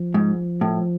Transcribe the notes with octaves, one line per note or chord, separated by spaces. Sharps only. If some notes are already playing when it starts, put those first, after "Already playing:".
Already playing: F3
G#2
A2